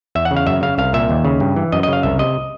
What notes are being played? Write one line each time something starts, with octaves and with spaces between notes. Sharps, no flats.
E2 E5
F#5
C#3
F5
F#2 E5
C#3 F5
C2 F5
A#2 E5
D#2
C#3
G2
E3
F#2 D#5
C#3 D#5
F5
C2 E5
C3 D#5